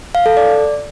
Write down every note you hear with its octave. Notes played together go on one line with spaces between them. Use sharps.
F5
A4
D5